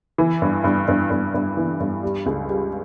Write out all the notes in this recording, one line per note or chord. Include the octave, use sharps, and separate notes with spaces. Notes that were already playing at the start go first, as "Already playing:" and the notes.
E3
G2
G2
G2
G2
G2
E3
G2
G3
C#2
G3